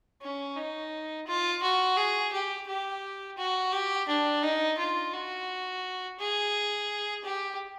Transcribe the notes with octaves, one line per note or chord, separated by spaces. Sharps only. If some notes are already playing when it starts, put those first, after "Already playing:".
C#4
D#4
F4
F#4
G#4
G4
G4
F#4
G4
D4
D#4
F4
F#4
G#4
G4